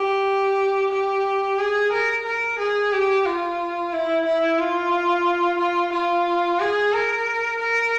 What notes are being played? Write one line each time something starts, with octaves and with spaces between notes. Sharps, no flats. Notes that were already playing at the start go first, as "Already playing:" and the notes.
Already playing: G4
G4
G#4
A#4
A#4
G#4
G4
F4
E4
E4
F4
F4
F4
G#4
A#4
A#4